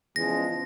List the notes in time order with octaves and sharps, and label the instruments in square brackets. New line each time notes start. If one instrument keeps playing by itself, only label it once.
[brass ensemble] E2 C#3 F3 G#3 [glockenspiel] A#6